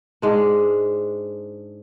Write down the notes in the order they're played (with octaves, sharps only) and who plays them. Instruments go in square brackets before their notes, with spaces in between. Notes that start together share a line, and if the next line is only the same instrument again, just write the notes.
[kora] G#2 G#3 D4